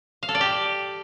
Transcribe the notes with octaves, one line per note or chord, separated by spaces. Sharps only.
F5
A4
D5
G4